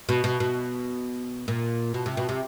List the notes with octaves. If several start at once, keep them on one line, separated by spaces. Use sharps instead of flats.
B2
B2
B2
A#2
B2
C3
B2
C3